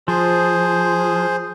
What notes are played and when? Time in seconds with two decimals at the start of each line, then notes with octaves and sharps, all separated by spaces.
0.08 F3 G#4 C5